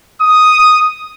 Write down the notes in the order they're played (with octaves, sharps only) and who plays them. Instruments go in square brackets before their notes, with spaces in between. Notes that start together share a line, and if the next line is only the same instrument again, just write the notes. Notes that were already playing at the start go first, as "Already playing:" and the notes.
[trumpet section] D#6